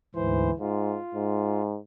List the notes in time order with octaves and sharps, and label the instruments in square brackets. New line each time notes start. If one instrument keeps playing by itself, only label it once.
[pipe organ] D2 G#2 C5 [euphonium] E3
[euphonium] G#2 [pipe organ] F4
[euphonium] G#2